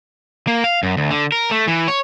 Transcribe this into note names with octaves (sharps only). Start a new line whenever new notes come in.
A#3
F5
F#2
D2
D3
A#4
A3
E3
C#5